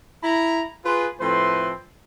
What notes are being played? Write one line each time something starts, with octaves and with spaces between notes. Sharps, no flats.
E4 A#5 B5
F4 G#4 B4
A2 F3 A3 C4 B4 C6